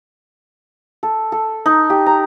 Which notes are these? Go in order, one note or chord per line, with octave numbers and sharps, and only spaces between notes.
A4
A4
D#4
G4
A#5